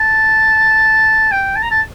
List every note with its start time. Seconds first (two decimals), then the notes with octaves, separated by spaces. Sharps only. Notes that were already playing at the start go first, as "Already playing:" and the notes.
Already playing: A5
1.31 G5
1.56 A5
1.63 A#5
1.71 A5